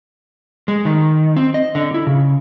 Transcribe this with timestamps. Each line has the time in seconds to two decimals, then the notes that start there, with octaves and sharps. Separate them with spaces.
0.68 G#3
0.85 D#3
1.37 C4
1.54 D#5
1.75 D3
1.94 E4
2.07 C#3